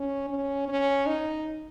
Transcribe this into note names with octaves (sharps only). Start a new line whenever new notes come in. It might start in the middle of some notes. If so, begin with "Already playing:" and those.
Already playing: C#4
C#4
C#4
D#4